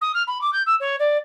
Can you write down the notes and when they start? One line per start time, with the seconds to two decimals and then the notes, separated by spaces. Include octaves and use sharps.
0.01 D#6
0.14 F6
0.27 B5
0.41 D6
0.53 G6
0.66 E6
0.80 C#5
0.99 D5